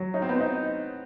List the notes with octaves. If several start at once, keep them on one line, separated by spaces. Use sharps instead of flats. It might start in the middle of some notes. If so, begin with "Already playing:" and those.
Already playing: F#3
C#4 D#4
C4
B3
C4 D#4